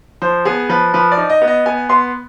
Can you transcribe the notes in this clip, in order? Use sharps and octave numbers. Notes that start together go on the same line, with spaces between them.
F3 C5
B3 G#4
F3 B4
F3 B4
D5
D#4
D#5
B3
D#5
B3 G#5
B3 C6